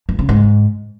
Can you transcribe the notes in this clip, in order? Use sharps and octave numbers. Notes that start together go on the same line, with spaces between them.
G2
C#3
G#2